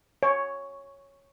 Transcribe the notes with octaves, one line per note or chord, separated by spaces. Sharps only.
C#5